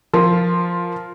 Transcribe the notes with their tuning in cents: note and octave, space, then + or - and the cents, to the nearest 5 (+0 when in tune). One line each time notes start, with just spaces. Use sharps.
F3 +0 F4 +0 A#4 +0